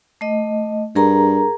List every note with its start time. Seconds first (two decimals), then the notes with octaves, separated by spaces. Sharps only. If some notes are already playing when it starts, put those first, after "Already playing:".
0.21 A3 D#5
0.96 G2 G#4 A#4 A#5